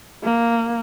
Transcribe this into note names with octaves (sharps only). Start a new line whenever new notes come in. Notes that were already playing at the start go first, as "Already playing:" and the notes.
A#3